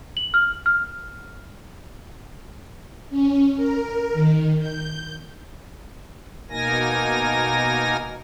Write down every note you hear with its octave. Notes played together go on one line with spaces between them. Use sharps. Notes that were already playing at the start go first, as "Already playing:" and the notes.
F#7
F6
F6
C#4
A#4
D#3
G6
B2 A#3 D#4 A#4 G#5 A#6